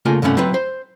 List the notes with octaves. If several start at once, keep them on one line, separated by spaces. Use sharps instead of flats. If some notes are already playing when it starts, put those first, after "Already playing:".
C#3 A3 A#3 F4 G#5
C2 G2 D3 A3 C#4 F#5
F#3 C4 E4 B4
C5